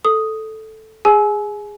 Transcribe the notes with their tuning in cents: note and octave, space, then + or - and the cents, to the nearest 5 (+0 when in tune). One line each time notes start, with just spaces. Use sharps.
A4 +0 D#6 +0
G#4 -15 G#5 +30 E6 -15